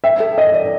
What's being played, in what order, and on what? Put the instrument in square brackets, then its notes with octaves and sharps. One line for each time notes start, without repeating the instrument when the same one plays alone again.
[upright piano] E5 [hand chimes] G5
[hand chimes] A4
[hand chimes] A4 [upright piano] D#5
[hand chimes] D5